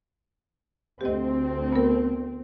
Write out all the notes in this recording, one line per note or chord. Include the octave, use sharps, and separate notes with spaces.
D2 C4 G4 D#5
B3 A#4